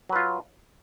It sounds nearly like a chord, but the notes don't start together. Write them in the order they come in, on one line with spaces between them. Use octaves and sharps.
F#3 B4 F4